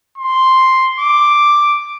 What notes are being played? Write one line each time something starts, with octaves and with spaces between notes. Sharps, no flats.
C6
D6